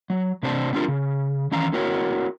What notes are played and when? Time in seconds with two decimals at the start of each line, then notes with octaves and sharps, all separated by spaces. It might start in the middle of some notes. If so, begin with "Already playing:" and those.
0.10 F#3
0.43 C3 C4 D4 C5 G#5 A5
0.73 B3 C4 D4 F4 G4 A#4
0.88 C#3
1.52 D#3 E3 C#4 F5 A#5
1.72 C4 E4 F#4 A#4 C#5 F#5